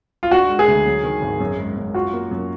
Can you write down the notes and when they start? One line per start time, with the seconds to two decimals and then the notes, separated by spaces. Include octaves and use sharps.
0.23 F4
0.31 D4 F#4
0.49 G#3
0.59 G#4
0.68 D2
0.85 F#3
1.03 D#3
1.22 G#1
1.40 F#2
1.59 G#3
1.77 F#2
1.94 F4 F#4
2.13 A#3
2.31 F#2